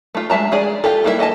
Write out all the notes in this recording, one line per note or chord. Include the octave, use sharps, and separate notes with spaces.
A3 F4
G#3 E5 A5 A#5
G#3 G#4 D5
F4 G4 A4
G3 A#3 E4 B4 E5
A4 D#5 G#5 A5